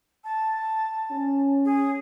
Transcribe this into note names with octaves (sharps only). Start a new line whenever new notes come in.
A5
C#4
G#4